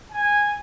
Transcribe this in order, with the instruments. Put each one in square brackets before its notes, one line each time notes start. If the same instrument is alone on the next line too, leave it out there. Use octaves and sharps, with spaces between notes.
[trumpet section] G#5